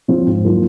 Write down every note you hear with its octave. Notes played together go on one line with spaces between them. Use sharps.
F3 C4 F4 C5
G#2
D#3 F#3 A#3 F4